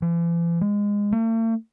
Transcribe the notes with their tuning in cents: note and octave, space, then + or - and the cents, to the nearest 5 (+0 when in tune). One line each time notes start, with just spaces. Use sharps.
E3 +45
G#3 -20
A3 +45